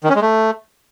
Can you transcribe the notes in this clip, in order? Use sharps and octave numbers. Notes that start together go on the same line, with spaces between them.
D#3
C#4
G#3
A3